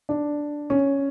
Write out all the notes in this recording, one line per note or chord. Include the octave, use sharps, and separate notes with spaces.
D4
C#4